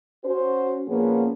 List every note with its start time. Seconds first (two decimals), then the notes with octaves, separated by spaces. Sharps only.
0.24 C#4 F#4 C5
0.88 A#2 F3 A#3 B3 C#4 G#4